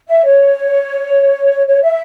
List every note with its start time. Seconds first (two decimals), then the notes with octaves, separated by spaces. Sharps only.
0.09 E5
0.24 C#5
1.67 C#5
1.82 E5